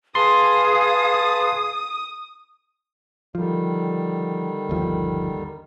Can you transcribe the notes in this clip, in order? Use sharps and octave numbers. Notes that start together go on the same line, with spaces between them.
G#4 B4 F5 A5 C6 D#6
D3 D#3 F3 G3
G1 D#2 F3